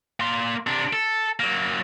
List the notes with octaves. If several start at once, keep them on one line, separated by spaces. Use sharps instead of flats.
A#3 C6
C3 D4
A4
F#3 A#3